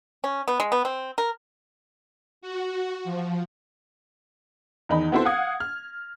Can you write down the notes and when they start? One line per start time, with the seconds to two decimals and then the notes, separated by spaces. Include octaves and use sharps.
0.24 C#4
0.48 B3
0.60 G#3
0.72 B3
0.85 C4
1.18 A#4
2.41 F#4
3.04 F3
4.89 E2 D#3 D#4 B5
5.12 B3 C4 E4 F#4 A4 C5
5.25 F5 F#5 D#6 G#6
5.60 F6